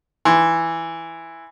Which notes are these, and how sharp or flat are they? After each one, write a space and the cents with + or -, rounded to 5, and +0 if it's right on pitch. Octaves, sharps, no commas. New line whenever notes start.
E3 +0 C6 +0